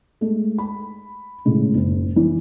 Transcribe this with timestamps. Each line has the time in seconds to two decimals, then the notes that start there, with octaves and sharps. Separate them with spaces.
0.21 G#3 A3
0.58 B5
1.45 A2 C#3 G#3
1.75 F#1
2.16 E3